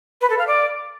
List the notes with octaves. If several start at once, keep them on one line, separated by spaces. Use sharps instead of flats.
B4
A4
F5
D5